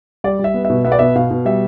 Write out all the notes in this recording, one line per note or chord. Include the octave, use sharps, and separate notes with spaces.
G3 D5
G3
E5
B3
B2 E5
B3 E5
D5
B2 E5
B2 F5
B2
G3 E5